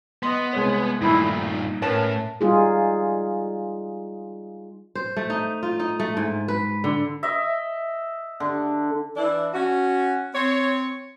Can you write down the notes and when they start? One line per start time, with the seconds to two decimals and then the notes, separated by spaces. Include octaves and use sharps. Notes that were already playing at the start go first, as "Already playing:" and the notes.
0.23 B3 D#5 C6
0.53 C2 G#3 C#5
1.01 G2 A#2 D#3 A3 E4
1.28 D#4
1.82 A2 C#4 A#4 B4 A5
2.41 G3 D#4 F4 G#4
4.95 C5
5.17 A3
5.30 D#4
5.63 F4
5.80 D#4
6.00 A3
6.17 G#2
6.48 B4
6.84 D3
7.23 D#5 E5
8.40 D3
9.16 E3 D4 E4
9.54 C#4 F#4
10.35 C4 C#5